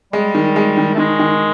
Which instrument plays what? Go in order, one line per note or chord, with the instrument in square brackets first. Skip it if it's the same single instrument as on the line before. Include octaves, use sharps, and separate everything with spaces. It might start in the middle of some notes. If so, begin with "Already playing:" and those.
[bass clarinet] G3 [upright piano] G#3
[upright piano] D#3
G#3
D#3
[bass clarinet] A3
[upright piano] D#3 [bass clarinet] G#3
[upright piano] D#3